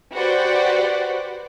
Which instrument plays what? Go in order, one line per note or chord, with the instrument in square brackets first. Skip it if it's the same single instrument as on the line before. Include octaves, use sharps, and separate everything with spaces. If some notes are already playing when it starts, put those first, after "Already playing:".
[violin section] F#4 G4 B4 C5 D5 F#5